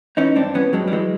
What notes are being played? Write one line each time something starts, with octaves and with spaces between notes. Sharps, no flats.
E3 C#4 D#4
G2 C4 D4
E3 B3 C#4
G2 F#3 G#3
G3
E3 F#3 G#3